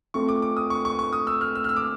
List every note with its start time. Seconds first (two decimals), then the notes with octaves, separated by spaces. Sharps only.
0.14 A3 C4 F4 A4 C#6
0.29 D6
0.42 D6
0.57 D#6
0.70 C#6
0.85 C#6
0.99 C#6
1.13 D#6
1.27 E6
1.41 F6
1.55 E6
1.64 F6
1.69 E6
1.76 D6